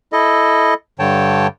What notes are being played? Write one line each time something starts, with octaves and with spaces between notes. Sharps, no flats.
E4 A4 D#5
G2 D3 C#5 G5 A5